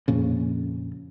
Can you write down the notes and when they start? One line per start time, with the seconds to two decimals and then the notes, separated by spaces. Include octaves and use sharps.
0.08 F2 A#2 C#3